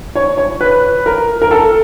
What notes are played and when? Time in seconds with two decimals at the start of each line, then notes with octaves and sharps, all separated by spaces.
0.15 C#5
0.37 C#5
0.61 B4
1.06 A#4
1.42 A#4
1.51 A4